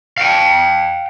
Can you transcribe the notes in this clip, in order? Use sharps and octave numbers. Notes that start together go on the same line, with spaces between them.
F5 G5